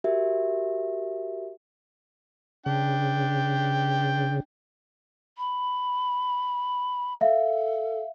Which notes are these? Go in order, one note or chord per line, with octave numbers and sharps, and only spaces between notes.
F#4 G4 A#4 E5
C#3 D4 G5
B5
A4 E5 F5